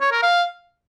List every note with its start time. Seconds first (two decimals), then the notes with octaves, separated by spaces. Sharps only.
0.01 C#5
0.12 A#4
0.23 F5